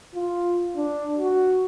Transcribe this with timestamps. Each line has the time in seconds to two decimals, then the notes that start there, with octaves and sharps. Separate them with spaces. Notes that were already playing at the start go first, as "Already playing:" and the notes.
0.15 F4
0.77 D4
1.18 F#4